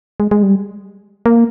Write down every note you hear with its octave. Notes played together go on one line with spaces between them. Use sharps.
G#3
G#3
G3
A#3